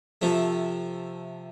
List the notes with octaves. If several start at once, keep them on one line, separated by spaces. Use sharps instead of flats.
C3 F3 A3